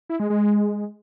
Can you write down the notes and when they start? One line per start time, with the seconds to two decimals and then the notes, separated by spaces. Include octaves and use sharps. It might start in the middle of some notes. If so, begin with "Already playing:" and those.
0.09 E4
0.20 G#3
0.30 G#3